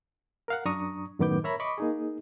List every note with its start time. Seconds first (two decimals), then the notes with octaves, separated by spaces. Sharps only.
0.48 A#4 F5 F#5
0.65 F#2 D4 A#5 C#6 D#6
1.19 F#2 A2 D#3 B3 D6 G6
1.44 A#4 C#5 E5 A#5 B5
1.60 D#5 B5 C#6 D6
1.78 A#3 D#4 G#4